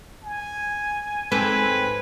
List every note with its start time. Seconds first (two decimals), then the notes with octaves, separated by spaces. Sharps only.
0.23 G#5
1.32 G#2 C4 A4 B4